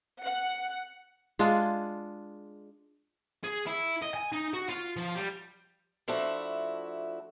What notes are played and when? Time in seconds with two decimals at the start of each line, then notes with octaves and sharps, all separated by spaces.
0.24 F#5
1.39 G#3 D4 F4
3.44 G#4
3.66 E4
4.02 D#5
4.14 G#5
4.32 D#4
4.54 F#4
4.69 F4
4.97 F3
5.15 G3
6.08 F3 A3 D4 E4 F#4